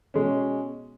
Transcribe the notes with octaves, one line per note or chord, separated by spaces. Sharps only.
B2 G#3 C#4